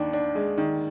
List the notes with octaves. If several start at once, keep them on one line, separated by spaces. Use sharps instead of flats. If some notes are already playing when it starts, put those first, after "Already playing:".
Already playing: D#2 D#3 D4
D4
G#3
D#3